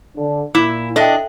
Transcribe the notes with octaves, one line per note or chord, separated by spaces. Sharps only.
D3
A#2 E4 D6
D4 A4 D#5 E5 G5